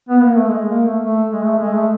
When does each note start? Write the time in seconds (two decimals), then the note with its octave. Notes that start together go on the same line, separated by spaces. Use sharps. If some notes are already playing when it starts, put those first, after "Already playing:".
0.09 B3
0.22 A#3
0.37 A3
0.50 G#3
0.69 A#3
0.86 A3
1.04 A3
1.32 G#3
1.45 A3
1.59 G#3
1.73 A3